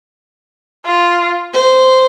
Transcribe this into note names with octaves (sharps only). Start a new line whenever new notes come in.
F4
C5